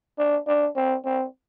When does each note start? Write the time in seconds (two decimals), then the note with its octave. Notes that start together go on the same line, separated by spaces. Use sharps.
0.18 D4
0.47 D4
0.76 C4
1.05 C4